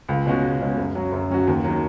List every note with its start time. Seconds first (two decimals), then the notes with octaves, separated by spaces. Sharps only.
0.09 C#2
0.26 B2 G#3 C#4 F#4
0.43 C#2
0.60 B2 G#3 C#4 F#4
0.78 F#2
0.95 F#3 C#4 F#4
1.12 F#2
1.30 F#3 C#4 F#4
1.48 D#2
1.64 D#3 F#3